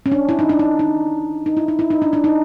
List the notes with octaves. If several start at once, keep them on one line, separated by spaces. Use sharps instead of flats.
C#4
D4
E4
D#4
D4
D#4
D#4
D#4
E4
D#4
E4
D#4
D4
D4
D#4